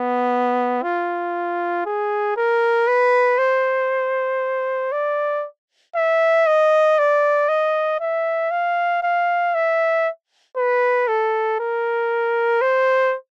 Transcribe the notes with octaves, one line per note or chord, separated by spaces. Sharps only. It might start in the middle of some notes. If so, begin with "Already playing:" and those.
Already playing: B3
F4
G#4
A#4
B4
C5
D5
E5
D#5
D5
D#5
E5
F5
F5
E5
B4
A4
A#4
C5